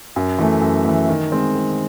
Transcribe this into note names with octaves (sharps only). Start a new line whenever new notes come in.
F#2
E3 A3
F#2
E3 A3
D#3
G#3 C4
D#3